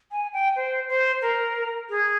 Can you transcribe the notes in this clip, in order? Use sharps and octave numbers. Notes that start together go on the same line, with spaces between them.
G#5
G5
C5
C5
A#4
G#4